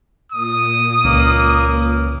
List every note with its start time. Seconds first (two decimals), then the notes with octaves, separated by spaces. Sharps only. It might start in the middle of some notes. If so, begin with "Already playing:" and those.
0.32 A#2 D#6
1.05 C#2 A#3